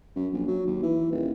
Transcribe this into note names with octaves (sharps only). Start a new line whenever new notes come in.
F#2
A#1
F#3
D#2
E3
D#1